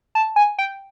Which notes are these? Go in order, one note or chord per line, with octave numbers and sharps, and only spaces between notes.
A5
G#5
G5